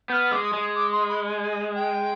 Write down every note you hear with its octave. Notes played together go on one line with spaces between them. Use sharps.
B3 F6 G6
G#3 D6
D#6
G#3
D6
C6
B5
G#5
G#5
G5